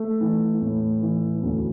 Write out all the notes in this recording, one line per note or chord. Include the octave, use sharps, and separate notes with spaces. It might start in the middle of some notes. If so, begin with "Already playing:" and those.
Already playing: A3
E3
A2
E3
D2 A3 C#4